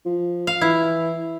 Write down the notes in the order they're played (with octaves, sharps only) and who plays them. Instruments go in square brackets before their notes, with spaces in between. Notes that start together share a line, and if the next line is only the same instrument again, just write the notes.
[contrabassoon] F3
[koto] F5
[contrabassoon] E3 [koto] E4